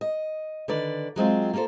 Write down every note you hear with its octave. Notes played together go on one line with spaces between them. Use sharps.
D#5
D3 D#3 B4 D5
F#3 G#3 C4 F4
A#3 F4 G#4 A4 C5